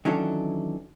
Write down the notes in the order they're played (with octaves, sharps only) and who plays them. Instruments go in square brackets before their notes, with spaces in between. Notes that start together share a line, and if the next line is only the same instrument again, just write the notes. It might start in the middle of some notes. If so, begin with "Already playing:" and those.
[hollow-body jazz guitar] D#3 E3 F#3 C#4 D4 A4